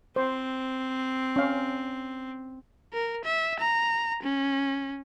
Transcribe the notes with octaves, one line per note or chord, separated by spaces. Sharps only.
C4 C5
C#4 F5
A#4
E5
A#5
C#4